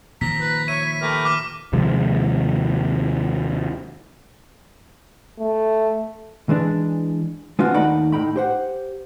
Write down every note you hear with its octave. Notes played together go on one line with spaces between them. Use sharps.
A#2 D#3 F3 A#5 B6
B4
C#5 E5 D#7
B5
A3 G4 A#4 B4
D6 F6
D#2 C3 F3 G#3
A3
E3 G#3 D4
G#3 B3 C4 D4 F4 F#4
D#2 A3 D#4 D5 F#5 B5
A2 D#4 G5 B5
G4 C5 F#5